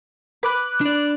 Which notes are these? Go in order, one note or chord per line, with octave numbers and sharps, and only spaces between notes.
B4 B5 D6 F#6
D4 D5